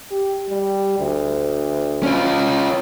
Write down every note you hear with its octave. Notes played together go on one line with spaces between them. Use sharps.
G4
G3
D2
C#4 F4